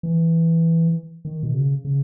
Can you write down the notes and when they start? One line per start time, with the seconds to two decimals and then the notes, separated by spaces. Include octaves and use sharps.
0.03 E3
1.25 D#3
1.43 B2
1.54 C#3
1.85 C#3